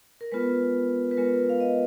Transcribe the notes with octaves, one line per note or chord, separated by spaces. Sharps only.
A#4
G#3 B3 F4 B4
B4
G#3 B3 F4 A#4
F5
D#5